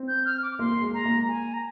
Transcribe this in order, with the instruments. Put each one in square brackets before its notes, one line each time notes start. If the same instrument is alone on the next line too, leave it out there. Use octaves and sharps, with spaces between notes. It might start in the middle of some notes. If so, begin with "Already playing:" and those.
Already playing: [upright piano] C4
[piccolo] G6
F6
D6
[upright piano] A#3 [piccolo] C6
[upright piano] G#3
[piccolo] A#5
[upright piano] A#3
[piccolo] G#5
A#5